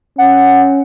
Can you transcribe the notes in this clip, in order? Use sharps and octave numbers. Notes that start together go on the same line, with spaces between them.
C#4 F#5